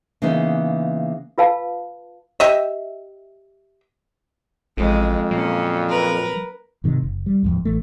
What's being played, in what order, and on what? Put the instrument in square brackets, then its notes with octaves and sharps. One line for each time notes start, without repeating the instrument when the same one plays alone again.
[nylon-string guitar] C#3 E3 A#3 B3 D#4
[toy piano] F4 B4 F5 A5
[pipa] G4 D#5 E5
[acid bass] A1 [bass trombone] F2 [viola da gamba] G#3
[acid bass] A#2 [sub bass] F#3 [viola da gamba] A#3 C#4
[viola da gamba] A#4 B4
[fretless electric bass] G#2 C3 D#3
F#1
G3
D1 A1 F2 G#2
A1 A3